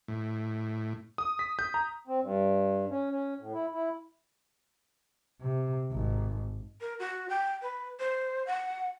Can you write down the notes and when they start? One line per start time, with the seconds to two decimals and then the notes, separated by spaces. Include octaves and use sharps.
0.08 A2
1.18 D#6
1.39 B6
1.59 G6
1.74 A#5
2.07 C4
2.22 G2
2.90 C#4
3.11 C#4
3.39 A2
3.54 E4
3.73 E4
5.41 C3
5.92 G#1
6.81 A#4
6.99 F#4
7.29 G5
7.62 B4
7.99 C5
8.47 F#5